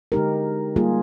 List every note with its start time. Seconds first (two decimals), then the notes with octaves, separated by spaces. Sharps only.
0.12 D3 G#3 D#4 G4 A#4
0.76 G3 A#3 F4 G#4